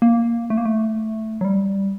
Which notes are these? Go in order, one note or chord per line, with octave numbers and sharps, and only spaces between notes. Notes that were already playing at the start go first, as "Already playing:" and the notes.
A#3
A3
A#3
A3
F#3
G3